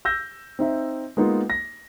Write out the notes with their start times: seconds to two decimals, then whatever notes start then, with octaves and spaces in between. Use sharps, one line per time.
0.05 E6 G6 A#6
0.59 C4 D#4 E5
1.17 G#3 A#3 B3 D#4 F4
1.50 A#6